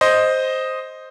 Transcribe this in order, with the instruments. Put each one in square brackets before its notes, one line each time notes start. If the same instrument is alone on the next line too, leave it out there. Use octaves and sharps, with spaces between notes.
[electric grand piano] C5 D#5